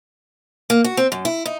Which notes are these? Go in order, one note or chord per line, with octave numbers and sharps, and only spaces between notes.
A#3
F#4
C4
F#2
E4
D#4